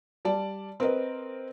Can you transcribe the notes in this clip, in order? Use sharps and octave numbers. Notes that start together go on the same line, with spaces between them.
G3 D5 A5
C4 A#4 B4 D#5